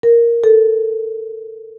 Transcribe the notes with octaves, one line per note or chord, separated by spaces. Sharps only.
A#4
A4